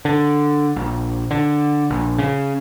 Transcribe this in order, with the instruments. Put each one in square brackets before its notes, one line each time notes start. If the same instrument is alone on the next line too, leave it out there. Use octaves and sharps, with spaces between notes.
[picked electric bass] D3
A#1
D3
A#1
C#3